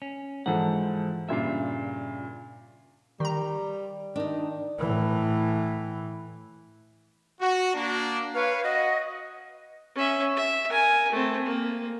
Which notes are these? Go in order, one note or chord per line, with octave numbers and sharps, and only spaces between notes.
C#4
G#2 E3 F3 A4 F#5
G2 A#2 C#3 F4 E5
D#3 G3 A#5
D#3 D4 D#4
A2 E3
F#4
A#3 D4
B4 C#5 F5
F#4 D#5
C#4 E5
E5
A#4 G#5
A3 C4
A#3